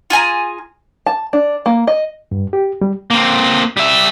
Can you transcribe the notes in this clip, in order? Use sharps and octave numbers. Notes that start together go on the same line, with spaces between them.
F4 G#4 G#5 A#5
A5
D4
A#3
D#5
G2
G4
G3
A#3 C4
G3 E5